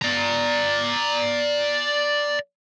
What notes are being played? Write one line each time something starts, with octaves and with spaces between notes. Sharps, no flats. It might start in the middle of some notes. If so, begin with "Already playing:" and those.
D5 A#5